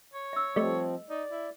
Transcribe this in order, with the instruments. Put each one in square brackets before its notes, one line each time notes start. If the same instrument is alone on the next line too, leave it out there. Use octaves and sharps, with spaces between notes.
[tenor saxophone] C#5
[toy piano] E5 E6
[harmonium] F3 C4 [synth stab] G3 A3 [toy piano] D#5
[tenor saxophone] D#4 [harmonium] D5
[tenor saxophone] E4